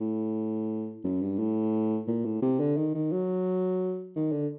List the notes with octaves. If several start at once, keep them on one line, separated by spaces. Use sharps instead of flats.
A2
F#2
G2
A2
A#2
A2
C3
D3
D#3
D#3
F#3
D#3
D3